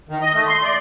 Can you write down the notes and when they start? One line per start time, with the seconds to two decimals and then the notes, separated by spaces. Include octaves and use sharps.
0.09 D#3
0.21 D#5
0.34 A3
0.47 C6
0.63 D5